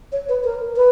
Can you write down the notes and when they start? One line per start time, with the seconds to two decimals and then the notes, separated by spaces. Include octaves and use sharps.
0.12 C#5
0.29 B4
0.44 A#4
0.77 B4